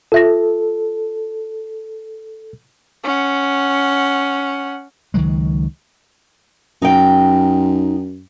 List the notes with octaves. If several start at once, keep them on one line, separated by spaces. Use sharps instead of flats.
F4 A4 E5 A#6
C#4 F#5
C#2 D#3 F#3 G#3
F#2 D#4 G5